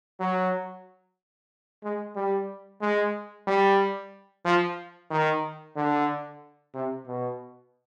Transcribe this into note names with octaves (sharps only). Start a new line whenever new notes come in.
F#3
G#3
G3
G#3
G3
F3
D#3
D3
C3
B2